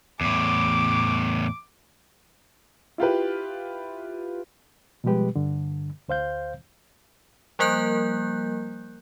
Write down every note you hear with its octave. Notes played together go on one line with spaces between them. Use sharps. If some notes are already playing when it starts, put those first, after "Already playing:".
E2 A2 D6
E4 F4 G4 B4
B2 F3 G3 G#3 G4 B4
G2 D3
D2 C5 F5 G6
F3 G3 A#3 A#4 F#6 G6